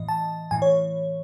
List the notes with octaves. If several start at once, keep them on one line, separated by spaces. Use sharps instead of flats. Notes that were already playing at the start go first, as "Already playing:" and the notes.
Already playing: A2 E3 D#5
A5
A2 E3 G#5
C#5